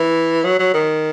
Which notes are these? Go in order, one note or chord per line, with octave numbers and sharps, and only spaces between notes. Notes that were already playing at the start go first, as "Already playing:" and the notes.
Already playing: E3
F#3
F#3
D#3